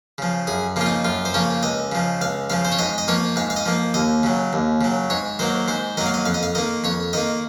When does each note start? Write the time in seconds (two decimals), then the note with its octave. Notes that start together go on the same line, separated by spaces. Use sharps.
0.18 C#3 F3
0.47 F#2 G#4
0.76 C#3 F3 A#3 F4
0.86 D#4
1.05 F#2 F4
1.25 C5
1.34 C#3 F3 A#3 C#5
1.63 C#2 D#5
1.92 C#3 F3
2.21 C#2 F5
2.50 C#3 F3 F5
2.65 C5
2.72 C#5
2.79 G#2 D#5
2.98 D#5
3.08 F3 A#3 C#5
3.36 G#2 F5
3.50 F5
3.56 D#5
3.66 F3 A#3
3.94 D#2 D#5
4.23 C#3 F#3
4.53 D#2
4.81 C#3 F#3
5.10 G#2 C#5
5.39 D#3 F#3 A#3 C5
5.68 G#2 C5
5.97 D#3 F#3 A#3 D#5
6.06 F5
6.14 D#5
6.25 F2 F5
6.34 D#5
6.43 F5
6.55 D#3 A#3 D#5
6.84 F2 C#5
7.13 D#3 A#3 D#5